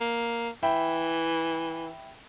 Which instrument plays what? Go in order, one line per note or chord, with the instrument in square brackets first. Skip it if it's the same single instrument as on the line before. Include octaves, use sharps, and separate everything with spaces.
[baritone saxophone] A#3
[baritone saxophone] E3 [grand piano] E5 G5 B5